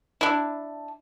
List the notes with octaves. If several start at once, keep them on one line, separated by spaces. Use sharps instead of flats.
D4 E4